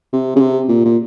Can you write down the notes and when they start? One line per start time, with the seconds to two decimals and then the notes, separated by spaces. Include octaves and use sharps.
0.13 C3
0.36 C#3
0.40 C3
0.68 A#2
0.85 A#2